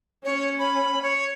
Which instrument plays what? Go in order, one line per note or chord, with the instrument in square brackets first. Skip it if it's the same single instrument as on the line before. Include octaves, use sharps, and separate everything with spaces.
[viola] C#4 [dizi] C#5
[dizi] B5
C#5